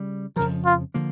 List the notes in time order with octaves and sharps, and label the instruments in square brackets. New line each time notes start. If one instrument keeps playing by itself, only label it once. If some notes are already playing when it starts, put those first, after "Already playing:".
Already playing: [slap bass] C#3 G3
[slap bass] F2 C#3 F3 [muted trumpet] A#4
[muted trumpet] F4
[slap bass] D3 F3 A#3